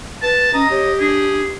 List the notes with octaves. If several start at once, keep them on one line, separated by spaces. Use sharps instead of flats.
B4 A5
C#4 D#5 A#5
G4 C#5
D4 G#4